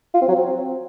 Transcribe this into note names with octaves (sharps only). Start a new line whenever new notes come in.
F4
C4
F#3
C4